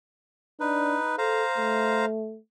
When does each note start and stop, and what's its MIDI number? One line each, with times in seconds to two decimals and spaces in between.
0.60 0.98 62
0.60 1.16 63
0.60 1.16 71
1.18 1.44 69
1.18 2.05 72
1.18 2.05 77
1.18 2.05 82
1.58 2.39 57